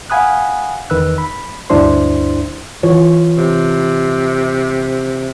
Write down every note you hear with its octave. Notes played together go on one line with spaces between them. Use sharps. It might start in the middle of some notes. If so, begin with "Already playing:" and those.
F5 F#5 G#5 B5 D#6 F#6
E2 D#3 B4 E6 F#6
B5
D2 G2 D4 E4 C5 C6
E3 F4 C#5
C3